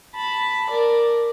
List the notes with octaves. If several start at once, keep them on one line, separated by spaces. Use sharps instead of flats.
A5 B5
A#4 D5